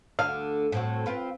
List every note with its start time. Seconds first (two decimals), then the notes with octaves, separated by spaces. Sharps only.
0.19 D2 D3 F5
0.72 A2 C4 F#4
1.06 C4 F4 B4